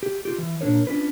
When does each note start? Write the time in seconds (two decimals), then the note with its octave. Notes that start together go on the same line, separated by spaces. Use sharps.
0.03 G4
0.25 F4 G4
0.38 E3
0.61 A#2 D4 A#4 C#5
0.87 C#4 D4 F4 B4